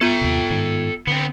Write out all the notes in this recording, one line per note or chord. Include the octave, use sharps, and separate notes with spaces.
B3 F4 A4 G5
D#2 C3
G#2 D#3
D3 B3 C4